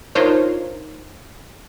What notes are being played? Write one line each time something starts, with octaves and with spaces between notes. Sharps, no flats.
D4 D#4 F4 A#4 C5 C#5